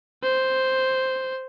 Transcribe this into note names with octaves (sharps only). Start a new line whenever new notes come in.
C5